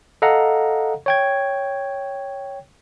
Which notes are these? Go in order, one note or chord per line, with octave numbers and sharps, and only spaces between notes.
A4 D#5 F5 F#5 A#5
C#5 G5 G#6